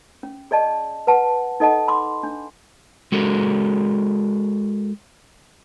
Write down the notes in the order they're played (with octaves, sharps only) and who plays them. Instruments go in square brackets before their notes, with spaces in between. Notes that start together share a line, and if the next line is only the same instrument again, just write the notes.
[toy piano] C#4
G#4 D5 D#5 A5
B4 F#5 A5
D#4 A4 D#5 F#5 A5
B5 C6 D6
D4
[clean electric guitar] G#3 F#4 A4 A#4